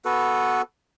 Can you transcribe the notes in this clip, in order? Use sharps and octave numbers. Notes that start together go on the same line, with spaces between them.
B3 F#4 A4 B4